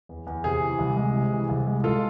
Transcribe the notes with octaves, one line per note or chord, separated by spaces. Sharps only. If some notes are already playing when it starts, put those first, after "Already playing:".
E2
E2
C3 G#4
E3
C2
G#3
C3
E3
C2
G#3
G#3 F4 A4